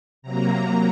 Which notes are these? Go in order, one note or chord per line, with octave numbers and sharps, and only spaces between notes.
C3 F#3 A#3 A#5
A#5